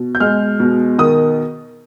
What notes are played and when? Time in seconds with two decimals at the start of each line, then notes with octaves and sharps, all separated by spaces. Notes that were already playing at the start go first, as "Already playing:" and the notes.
Already playing: B2
0.15 G6
0.20 G#3 F6
0.60 B2
0.98 D#3 D#6